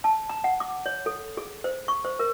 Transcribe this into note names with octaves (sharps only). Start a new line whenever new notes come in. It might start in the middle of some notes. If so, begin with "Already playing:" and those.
A5
A#5
F#5
D6
C#5
A4
G#4
C5
C#6
C5
A#4